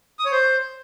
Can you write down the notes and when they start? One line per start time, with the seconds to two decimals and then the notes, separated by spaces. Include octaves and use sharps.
0.19 D#6
0.25 C#5
0.32 C5